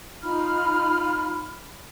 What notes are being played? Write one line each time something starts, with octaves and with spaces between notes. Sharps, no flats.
D#4 F4 B5 F6